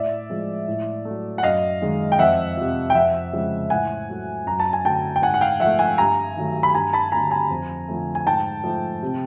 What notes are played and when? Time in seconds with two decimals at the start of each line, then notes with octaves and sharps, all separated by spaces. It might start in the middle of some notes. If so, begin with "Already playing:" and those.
Already playing: A2 D5 E5
0.30 F3 G#3
0.68 A2
1.05 F#3 A3
1.38 F#5
1.43 F#2 D#5 F5
1.82 D#3 G#3
2.12 G5
2.19 F2 E5 F#5
2.57 C3 F3
2.90 G5
2.95 F2 E5 F#5
3.33 C#3 F3 G#3
3.70 A2 F#5 G#5
4.09 F#3 A3
4.46 F#2 A#5
4.60 A5
4.73 G#5
4.85 D3 F#3 A3 G5 A5
5.16 G5
5.22 G#2 F#5 G#5
5.34 F#5
5.41 F5 G5
5.60 F3 A3 E5 F#5
5.79 F#5 G#5
5.98 G2 G#5 A#5
6.36 D#3 F#3 A3
6.63 B5
6.75 G2 G#5 A#5
6.93 A5 B5
7.12 D3 F#3 A3 G#5 A#5
7.31 G#5 A#5
7.50 F2
7.88 D3 F3 A3
8.15 G#5
8.26 G#2 G5 A5
8.64 F3 A3
9.03 C3